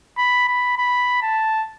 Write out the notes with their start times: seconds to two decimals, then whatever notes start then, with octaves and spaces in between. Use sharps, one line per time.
0.17 B5
0.48 B5
0.77 B5
1.22 A5